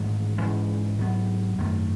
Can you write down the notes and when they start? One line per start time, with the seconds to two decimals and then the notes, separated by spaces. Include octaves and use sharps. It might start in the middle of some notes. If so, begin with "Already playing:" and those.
Already playing: A1 G#2 D#3 G#3
0.39 G#2 E3 G#3 C#4
0.98 G#2 F#3 B3
1.58 G#1 F#2 D#3 A3